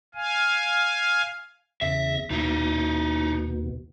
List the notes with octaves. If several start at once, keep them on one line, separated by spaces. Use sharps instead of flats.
F5 G#5
E2 C#3 E5 A#6
D#2 B2 D#4 E4